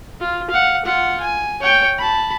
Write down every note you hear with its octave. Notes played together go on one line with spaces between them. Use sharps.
F4
F5 F#5
F4 F#5
G#5
C#5 G5
A5 B5